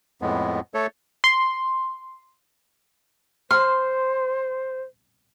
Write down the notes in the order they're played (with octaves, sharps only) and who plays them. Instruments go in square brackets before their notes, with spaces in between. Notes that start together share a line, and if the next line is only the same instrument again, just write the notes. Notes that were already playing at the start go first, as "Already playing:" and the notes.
[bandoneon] F2 A2 G#3 B3
A3 A4 C#5
[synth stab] C6
[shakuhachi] C5 [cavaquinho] C6 [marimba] F6